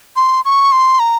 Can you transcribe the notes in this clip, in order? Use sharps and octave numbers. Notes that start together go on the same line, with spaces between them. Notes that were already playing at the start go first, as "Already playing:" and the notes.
C6
C#6
C6
A#5